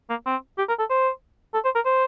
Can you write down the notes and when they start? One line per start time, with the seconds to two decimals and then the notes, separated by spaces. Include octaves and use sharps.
0.10 A#3
0.26 C4
0.58 G4
0.69 A#4
0.79 A4
0.90 C5
1.54 A4
1.65 C5
1.75 A#4
1.85 C5